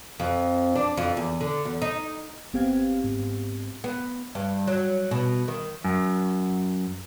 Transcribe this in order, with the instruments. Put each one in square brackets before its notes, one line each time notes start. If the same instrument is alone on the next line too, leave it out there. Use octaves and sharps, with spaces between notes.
[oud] F2
D4
F2
E2
D3
E2
D#4
[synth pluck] G1 B3 C4 G4 F5 G#6
G#2
[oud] B3
G2
F#3
B2
D#3
[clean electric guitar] F#2